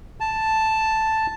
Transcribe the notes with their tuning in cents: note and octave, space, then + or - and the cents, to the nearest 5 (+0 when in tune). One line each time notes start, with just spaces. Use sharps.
A5 +0